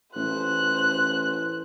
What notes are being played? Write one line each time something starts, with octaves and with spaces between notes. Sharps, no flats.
A1 C5 F#6